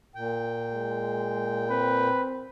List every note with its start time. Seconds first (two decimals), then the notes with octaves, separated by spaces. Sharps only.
0.15 A#2 G5
0.74 G#3
1.70 C4 B4